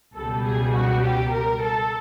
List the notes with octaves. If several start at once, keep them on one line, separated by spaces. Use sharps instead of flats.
C#2 B2 G3 A4
G#4
F#4
G4
A#4
A4